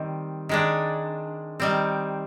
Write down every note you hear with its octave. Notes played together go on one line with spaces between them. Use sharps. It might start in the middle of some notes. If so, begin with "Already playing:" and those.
Already playing: D#3 G3 C4
D#3 G#3 D4
D#3 G3 C4